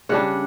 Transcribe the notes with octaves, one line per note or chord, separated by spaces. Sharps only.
C#3 G3 D4 F#5